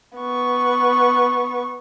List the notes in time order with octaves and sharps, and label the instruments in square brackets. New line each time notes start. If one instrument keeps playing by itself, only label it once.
[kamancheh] B3 C#6